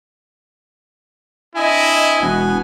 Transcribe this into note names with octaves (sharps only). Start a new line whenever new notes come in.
C4 D4 E4 D#5 G#5
E1 B2 E3 B3